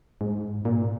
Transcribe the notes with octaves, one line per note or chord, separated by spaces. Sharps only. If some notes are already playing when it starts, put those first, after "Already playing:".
G#2
A#2